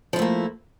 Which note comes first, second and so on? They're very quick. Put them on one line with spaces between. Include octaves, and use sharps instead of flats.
F3 E4 A3 A#3